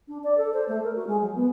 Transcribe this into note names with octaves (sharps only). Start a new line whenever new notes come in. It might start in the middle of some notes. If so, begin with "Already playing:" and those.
D4
D5
A4
C5
A3
A#4
F#4
G#3
F#3
B3